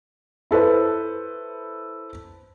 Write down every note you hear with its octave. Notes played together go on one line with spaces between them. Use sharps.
E4 A4 B4 C5